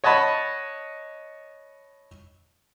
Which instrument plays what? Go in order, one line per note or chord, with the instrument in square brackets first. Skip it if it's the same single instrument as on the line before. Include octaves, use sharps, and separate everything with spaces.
[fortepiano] C#5 D#5 F#5 A5 B5